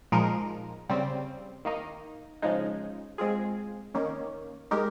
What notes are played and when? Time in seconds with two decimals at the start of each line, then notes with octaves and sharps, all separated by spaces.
0.12 A#2 F3 G#3 D#4 A#4
0.89 C#3 G3 C4
1.65 D#3 A#3 D#4
2.42 C#3 F3 G#3 D#4
3.18 G#3 C4 F4 G#4
3.94 D#3 A#3 C#4
4.71 G#3 D#4 G4 A#4